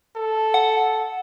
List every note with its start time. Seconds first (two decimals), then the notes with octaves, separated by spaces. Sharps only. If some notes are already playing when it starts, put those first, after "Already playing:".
0.16 A4
0.54 F#5